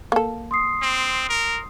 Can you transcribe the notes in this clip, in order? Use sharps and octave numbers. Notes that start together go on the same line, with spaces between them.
A#3 A4
C6 D#6 C7
C4
A#4